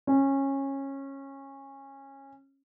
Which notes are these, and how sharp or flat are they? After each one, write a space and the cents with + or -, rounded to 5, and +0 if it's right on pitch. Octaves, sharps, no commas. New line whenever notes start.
C#4 -20